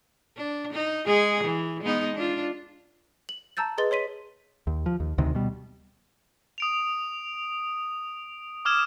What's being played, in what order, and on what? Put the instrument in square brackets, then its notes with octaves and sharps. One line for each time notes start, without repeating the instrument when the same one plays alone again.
[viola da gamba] D4
D#4
G#3 G#4
E3
G#3 B3 D#4
D4 F4
[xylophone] F#7
A5 A#5 E6 G6 A6
G#4 B4 D#5 C6 A6 G7
C#5 C6 B6 D#7
[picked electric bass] D#2
F3
D#2
D2 C3 D#3
B2 G3
[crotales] D#6 D7 F7
D6 D#6 F6 G#6 E7